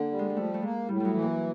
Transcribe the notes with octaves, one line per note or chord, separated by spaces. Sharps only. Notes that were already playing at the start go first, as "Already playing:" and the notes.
Already playing: D3 A#3
G3
G#3
G#3
F3 A3
A3
G#3 A#3
A2 G3
F#3 G3
E3
A#3